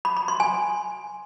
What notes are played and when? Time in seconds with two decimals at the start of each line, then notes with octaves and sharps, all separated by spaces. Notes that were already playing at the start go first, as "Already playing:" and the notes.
0.05 B5
0.17 B5
0.28 C6
0.40 G#5